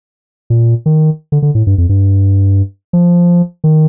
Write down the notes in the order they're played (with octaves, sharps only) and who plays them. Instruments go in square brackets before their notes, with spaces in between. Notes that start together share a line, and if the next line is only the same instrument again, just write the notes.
[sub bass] A#2
D#3
D3
D3
A2
G2
F2
G2
F3
D#3